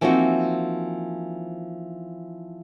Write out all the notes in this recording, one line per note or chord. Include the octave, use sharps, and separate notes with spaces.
E3 F3 A#3 C4 D#4 F#4